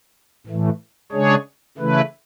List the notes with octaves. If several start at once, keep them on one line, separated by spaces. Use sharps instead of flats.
A2 E3 A3
C#3 G#3 D4 G#4 C#5
C#3 E3 A3 E4 B4